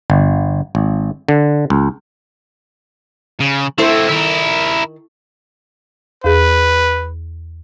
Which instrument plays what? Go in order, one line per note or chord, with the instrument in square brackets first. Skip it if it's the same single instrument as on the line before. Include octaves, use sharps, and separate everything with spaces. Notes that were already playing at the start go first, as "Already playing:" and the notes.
[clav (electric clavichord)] G1
G#1
D3
C#2
[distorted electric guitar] C#3
[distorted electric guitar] A3 C4 [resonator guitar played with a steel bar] E4 A4 C5
[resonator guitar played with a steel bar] D#3 [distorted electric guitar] E4 A#4
[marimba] E2 G#4 [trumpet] B4